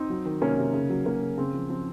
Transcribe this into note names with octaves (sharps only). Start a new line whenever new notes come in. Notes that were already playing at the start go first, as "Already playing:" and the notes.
Already playing: C4 D#4
F#3
D#3
C3 A#3 C#4
C3
C#3
F#3
F#3 A#3
C#3
C#3 C4
F3
F3 C4